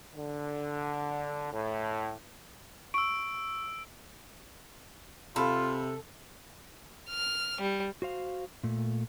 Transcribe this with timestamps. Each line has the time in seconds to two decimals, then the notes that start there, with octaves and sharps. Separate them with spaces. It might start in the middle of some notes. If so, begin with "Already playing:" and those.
0.16 D3
1.53 A2
2.94 C#6 E6 D7
5.36 C3 F4 A4 F5 B5
7.10 F6
7.61 G3
8.02 F#4 C5 F5
8.63 A#2 A3